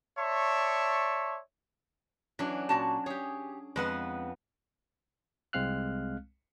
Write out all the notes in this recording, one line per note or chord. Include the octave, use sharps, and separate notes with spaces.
C#5 D5 E5 A5 C6 C#6
E3 F#3 C#4 D4
A#2 F#4 A5
G4 G#4 C#5
F2 G#3 B3 F#5
C2 G#3 C4 F5 F6 F#6